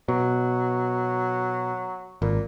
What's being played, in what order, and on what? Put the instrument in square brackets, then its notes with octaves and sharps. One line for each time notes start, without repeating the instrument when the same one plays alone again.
[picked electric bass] B2 [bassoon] F#3
[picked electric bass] G#1 [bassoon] A#2